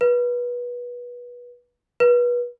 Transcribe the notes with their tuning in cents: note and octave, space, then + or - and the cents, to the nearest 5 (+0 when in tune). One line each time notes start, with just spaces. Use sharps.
B4 -25
B4 -30